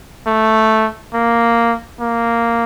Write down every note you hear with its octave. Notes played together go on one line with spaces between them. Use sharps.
A3
A#3
A#3